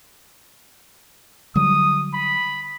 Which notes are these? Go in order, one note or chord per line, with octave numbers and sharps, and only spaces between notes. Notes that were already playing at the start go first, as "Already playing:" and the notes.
D3 F#3 G3 D#6
B5